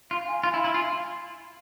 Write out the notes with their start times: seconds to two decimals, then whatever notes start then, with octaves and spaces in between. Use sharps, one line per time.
0.11 F4 F5
0.27 G#5
0.43 F4 F5
0.54 E4
0.64 E4
0.74 F4 G#5